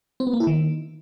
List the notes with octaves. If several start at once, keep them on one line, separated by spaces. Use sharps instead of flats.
C4
B3
A#3
E4
D#3